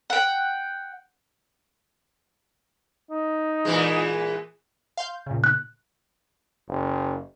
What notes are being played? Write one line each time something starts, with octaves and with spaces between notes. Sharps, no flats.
F#5 G5
D#4
A#2 E3 G#3
F5 C6 G6
A#2 C#3
F#6
F#1